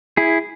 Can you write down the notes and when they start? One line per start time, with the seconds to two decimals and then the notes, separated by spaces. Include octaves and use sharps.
0.17 E4 G#4